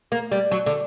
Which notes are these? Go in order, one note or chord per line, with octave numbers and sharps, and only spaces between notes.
A#3
G3
F#3
D3